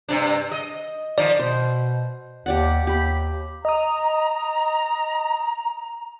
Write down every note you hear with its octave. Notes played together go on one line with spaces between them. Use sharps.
G2 C3 D4
D#5
D#3 F3 D5
B2 C5
D#2 G4 D5 F#5
D#2 G4 B5
D#5 A#5 D#6